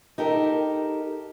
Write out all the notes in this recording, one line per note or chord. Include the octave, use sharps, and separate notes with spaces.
D#4 G4 A4 A#4